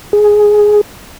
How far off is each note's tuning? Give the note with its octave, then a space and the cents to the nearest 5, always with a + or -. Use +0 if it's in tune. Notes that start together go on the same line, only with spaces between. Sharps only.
G#4 +5